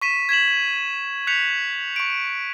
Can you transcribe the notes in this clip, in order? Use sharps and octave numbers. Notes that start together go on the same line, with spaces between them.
C#6 B6 D#7 E7
G#6 B6 E7 F#7
F#6 G6 B6 C#7 F7
C#6 D7